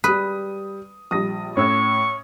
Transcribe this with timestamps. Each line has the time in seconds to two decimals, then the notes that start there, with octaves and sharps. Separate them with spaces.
0.04 G3 B4 D#6
1.11 A#1 G3 D#6 A#6
1.57 A2 C#4 C#6 E6 G#6